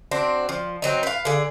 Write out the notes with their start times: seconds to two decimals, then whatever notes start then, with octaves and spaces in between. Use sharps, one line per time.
0.11 C4 D4 F#4
0.49 F3
0.82 F#3 C4 D#4
1.03 B4 F5
1.25 D3 G#4